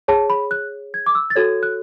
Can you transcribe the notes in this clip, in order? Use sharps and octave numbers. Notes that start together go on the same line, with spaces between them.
G#4 C#5 A5
B5
F#6
G#6
D6
E6
A6
F#4 A4 C#5 G#6
F#6